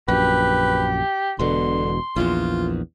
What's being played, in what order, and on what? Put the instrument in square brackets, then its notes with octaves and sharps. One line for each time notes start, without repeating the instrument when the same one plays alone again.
[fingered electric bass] A#1 F#2 [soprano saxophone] G4 [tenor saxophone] B4
[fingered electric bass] E1 B2 [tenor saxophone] D3 [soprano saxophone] C6
[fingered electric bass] A#1 E2 [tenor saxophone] F4